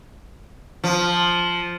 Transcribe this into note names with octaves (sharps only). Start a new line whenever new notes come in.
F3